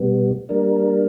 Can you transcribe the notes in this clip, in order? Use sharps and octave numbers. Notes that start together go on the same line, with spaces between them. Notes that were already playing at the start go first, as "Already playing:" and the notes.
Already playing: B2 G3 B3
G3 A#3 D4 A#4